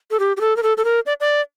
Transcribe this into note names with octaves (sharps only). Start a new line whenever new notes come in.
A4
G4
G4
A4
A#4
A4
A4
A#4
D5
D5